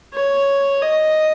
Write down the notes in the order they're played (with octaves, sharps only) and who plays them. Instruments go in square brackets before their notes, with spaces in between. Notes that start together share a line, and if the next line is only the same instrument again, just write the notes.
[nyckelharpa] C#5
D#5